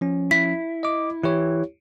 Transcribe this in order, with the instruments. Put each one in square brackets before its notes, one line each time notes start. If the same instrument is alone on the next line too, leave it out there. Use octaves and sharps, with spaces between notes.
[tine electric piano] F3 C#4
[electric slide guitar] E4 [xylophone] B6
[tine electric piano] D#5 D6
[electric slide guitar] E3 [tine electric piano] E4 G4 C#5